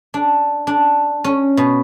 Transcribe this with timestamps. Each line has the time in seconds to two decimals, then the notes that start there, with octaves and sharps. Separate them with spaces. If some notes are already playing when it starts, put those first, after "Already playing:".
0.14 D4
0.67 D4
1.24 C#4
1.57 B2